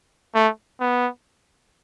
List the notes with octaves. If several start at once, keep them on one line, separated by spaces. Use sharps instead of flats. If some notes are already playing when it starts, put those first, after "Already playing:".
A3
B3